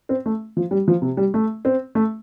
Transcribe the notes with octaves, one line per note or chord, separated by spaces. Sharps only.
C4
A3
F3
G3
F3
C3
G3
A3
C4
A3